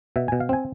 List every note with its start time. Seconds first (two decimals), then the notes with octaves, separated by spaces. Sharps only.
0.16 B2 E5
0.28 B2 G#5
0.40 F5
0.49 C4 G#5